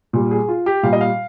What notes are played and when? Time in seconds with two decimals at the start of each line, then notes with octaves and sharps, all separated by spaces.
0.13 A#2 G3
0.31 G#4
0.48 F4
0.66 G4
0.83 A#2 G3 F5
0.93 D#5
1.01 F5